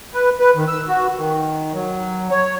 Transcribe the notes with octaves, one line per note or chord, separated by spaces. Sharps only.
B4
B4
D#3
E6
F#4
D#3
F#3
C#5